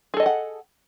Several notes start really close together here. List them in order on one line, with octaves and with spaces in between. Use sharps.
G#4 A4 D#5 A5 F#5